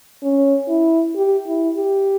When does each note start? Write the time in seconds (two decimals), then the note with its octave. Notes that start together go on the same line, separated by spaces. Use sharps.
0.22 C#4
0.69 E4
1.16 G4
1.47 E4
1.78 G4